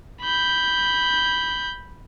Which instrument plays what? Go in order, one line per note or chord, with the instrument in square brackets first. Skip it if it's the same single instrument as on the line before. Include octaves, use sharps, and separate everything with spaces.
[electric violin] B5 G6